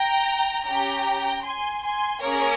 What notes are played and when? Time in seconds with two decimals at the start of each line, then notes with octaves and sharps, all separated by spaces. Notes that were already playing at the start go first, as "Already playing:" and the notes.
Already playing: G5 A#5
0.67 C#4 G4 G5 A#5
1.44 G#5 C6
1.83 G#5 C6
2.22 A#3 C#4 G#4 A#4 C#5